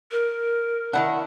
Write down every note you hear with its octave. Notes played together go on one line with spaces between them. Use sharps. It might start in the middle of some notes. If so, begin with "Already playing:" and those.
A#4
D#3 B3 D4 E4 F#5